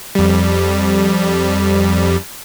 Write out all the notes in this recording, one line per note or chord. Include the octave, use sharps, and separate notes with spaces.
F2 G3